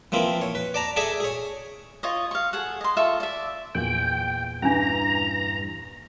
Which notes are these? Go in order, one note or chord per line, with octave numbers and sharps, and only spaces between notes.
E3 F3 A#3 C4 E4
C#5
B4
D5 A5 A#5
G#4 A4 D5 E5 G#5 A5
G#4 C#5
F4 C#5 D#5
F5 C#6
G#4 A4 F#5
D#5 C6
F4 A4 E5 C#6
D5 E5
E2 A#2 G5 F#7
G2 E3 C#4 D4 A#5